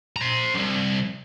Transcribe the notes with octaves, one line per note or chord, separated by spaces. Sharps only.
C5 A#5
C2 F#2